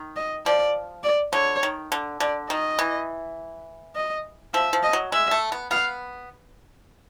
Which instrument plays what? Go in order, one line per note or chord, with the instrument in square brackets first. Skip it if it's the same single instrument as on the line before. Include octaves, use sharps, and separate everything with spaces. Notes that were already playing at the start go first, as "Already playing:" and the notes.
Already playing: [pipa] D#3
[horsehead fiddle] D#5
[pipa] F3 [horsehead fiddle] D5
[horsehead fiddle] D5
[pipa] D3 [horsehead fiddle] C#5
[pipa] D#3
D3
[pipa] D3 [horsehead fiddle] D5
[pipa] D#3 [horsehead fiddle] D#5
[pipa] E3
[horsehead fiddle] D#5
[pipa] F3 [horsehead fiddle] E5
[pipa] F3
[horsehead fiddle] D#5
[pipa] F#3
[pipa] G#3 [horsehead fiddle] E5
[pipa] A3
B3
[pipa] B3 [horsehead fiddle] F5